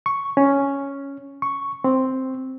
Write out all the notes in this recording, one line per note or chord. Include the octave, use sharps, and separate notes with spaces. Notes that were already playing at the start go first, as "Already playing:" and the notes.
C#6
C#4
C#6
C4